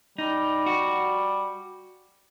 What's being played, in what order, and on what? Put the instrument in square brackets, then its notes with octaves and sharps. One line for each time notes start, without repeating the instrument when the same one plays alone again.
[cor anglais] G3 [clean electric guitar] D#4
[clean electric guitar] F#4